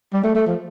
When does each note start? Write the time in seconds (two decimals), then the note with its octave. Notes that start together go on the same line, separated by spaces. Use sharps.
0.13 G3
0.23 A3
0.35 A3
0.46 F3